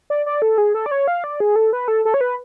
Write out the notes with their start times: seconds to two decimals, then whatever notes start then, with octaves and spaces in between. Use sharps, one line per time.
0.10 D5
0.26 D5
0.42 A4
0.58 G#4
0.74 A4
0.86 D5
0.91 C#5
1.08 F5
1.24 D5
1.40 G#4
1.56 A4
1.73 B4
1.88 A4
2.05 A4
2.14 C#5
2.21 B4